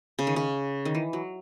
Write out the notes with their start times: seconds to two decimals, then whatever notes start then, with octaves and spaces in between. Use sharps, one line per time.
0.19 C#3
0.27 D#3
0.36 C#3
0.85 D#3
0.95 E3
1.13 F#3